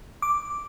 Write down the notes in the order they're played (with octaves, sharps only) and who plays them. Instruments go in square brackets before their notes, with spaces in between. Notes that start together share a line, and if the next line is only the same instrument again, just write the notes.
[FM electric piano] D6